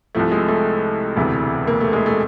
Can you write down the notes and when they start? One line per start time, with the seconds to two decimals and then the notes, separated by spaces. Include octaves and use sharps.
0.15 C2 C3 F3 A3
0.32 G#3
0.48 A3
1.17 E1 D2 C3 E3
1.67 A#3
1.81 A3
1.93 G#3
2.06 A3